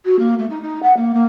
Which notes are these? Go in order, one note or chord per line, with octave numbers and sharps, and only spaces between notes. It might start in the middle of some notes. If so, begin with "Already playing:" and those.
F#4
A#3
A3
D#4
D#4
F#5
A#3
A#3